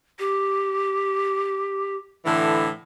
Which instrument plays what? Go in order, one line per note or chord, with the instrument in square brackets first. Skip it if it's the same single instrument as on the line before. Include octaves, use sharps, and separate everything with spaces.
[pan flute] G4
[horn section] A2 D3 E3